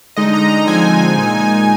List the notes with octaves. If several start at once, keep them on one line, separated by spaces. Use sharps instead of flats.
D3 G#3 D#4 D#5
A#5
A#5
D3 F3 G#3 C4 D#4 G#5
A#2 G#3 D#4